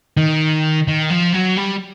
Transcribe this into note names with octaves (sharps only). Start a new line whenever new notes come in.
D#3
D#3
F3
F#3
G3